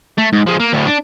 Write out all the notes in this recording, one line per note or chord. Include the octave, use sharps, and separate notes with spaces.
A3
G#2
F3 G#3
A#3
D2 A2
D4